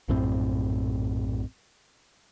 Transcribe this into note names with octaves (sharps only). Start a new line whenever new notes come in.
A#1 F#2 A2 C4